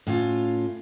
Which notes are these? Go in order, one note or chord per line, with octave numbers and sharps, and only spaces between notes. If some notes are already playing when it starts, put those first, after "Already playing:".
A2 C#4 F4